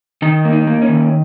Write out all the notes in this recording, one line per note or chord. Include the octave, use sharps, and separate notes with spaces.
D#3 D#4
A#3
D#4
A#3
C#4
D#3